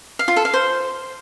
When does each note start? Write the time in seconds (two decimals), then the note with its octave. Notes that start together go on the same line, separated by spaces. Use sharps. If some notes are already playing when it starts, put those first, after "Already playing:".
0.19 F5
0.28 F4
0.36 A4
0.45 F5
0.54 C5